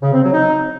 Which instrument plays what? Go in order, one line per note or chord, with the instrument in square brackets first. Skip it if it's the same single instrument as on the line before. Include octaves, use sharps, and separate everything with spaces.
[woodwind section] C#3
C4
F#3
D#4